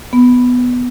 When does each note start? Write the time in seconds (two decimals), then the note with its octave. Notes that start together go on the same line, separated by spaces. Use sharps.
0.13 B3